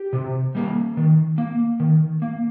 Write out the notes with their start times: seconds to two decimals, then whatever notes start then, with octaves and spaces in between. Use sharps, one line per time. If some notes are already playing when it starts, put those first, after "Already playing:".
Already playing: G4
0.13 C3
0.55 G3 A#3
0.97 D#3
1.38 A#3
1.80 D#3
2.22 A#3